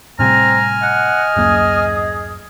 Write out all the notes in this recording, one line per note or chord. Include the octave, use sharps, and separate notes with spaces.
A2 C3 G3 C4 G#5 A#5 F6
D#5 F#5
D1 F#2 A#3 G#4